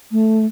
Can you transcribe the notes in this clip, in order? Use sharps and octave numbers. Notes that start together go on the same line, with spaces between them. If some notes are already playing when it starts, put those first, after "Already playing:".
A3